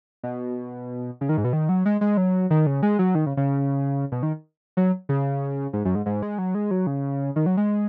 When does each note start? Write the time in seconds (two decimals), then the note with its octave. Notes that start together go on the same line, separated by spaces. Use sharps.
0.23 B2
1.21 C#3
1.29 D#3
1.38 G#2
1.44 B2
1.53 D#3
1.69 F#3
1.86 G#3
2.01 G#3
2.17 F#3
2.50 D#3
2.66 C#3
2.83 G#3
2.99 F#3
3.15 D#3
3.26 C#3
3.37 C#3
4.12 B2
4.23 D#3
4.77 F#3
5.09 C#3
5.73 G#2
5.85 F#2
5.95 G#2
6.06 G#2
6.22 G#3
6.38 F#3
6.55 G#3
6.71 F#3
6.87 C#3
7.36 D#3
7.46 F#3
7.57 G#3